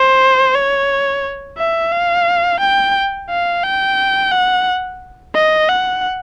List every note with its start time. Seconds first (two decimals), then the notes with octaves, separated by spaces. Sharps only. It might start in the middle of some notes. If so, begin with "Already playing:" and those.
Already playing: C5
0.55 C#5
1.58 E5
1.92 F5
2.60 G5
3.30 F5
3.63 G5
4.32 F#5
5.35 D#5
5.69 F#5